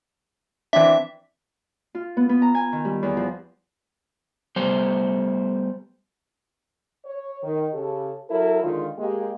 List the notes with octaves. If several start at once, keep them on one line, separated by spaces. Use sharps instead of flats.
E3 C4 D4 E5
F4
B3
B3
A#5
G#5
D#3
G3
E2
F3
G3 A3 B3 C5
C#5
D#3
C#3 G4 A4
F#3 E4 F#4 A4 A#4
D3 D#3 G#3 F4
G#3 A#3 G4